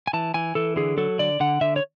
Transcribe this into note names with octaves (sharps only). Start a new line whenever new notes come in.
G#5
E3 A5
E3 G#5
E3 A4
D3 G#4
F#3 A4
D3 D5
D3 F#5
D3 E5
C#5